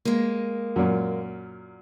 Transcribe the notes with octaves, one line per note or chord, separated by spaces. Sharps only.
G#3 A#3
F#2 A#2